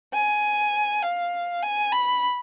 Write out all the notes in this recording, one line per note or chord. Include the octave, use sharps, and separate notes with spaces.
G#5
F5
G#5
B5